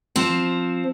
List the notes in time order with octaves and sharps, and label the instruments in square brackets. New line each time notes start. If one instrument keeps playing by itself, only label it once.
[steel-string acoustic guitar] F3 C4